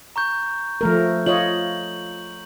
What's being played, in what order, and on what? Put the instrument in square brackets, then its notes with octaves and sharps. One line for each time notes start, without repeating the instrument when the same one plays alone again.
[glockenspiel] A#5 C#6 G6
[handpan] F3 A3 A#4
[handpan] F4 C#5 D#5 [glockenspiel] F#7